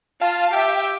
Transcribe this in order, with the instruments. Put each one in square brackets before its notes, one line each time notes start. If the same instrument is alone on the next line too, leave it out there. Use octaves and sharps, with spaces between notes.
[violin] F4 [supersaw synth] F5 A5
[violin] G4 [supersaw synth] E5 G5